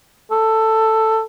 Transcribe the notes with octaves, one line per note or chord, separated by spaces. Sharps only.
A4